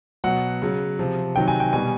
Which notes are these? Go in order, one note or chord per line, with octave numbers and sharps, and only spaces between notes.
B2 F#3 F#5
C#3 F#3
C3 F3
C3 D#3 F#3 G5
G#5
G5
B2 G3 G#5